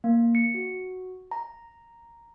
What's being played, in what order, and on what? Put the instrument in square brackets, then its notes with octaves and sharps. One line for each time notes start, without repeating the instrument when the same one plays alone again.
[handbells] A#3
C#7
F#4
A#5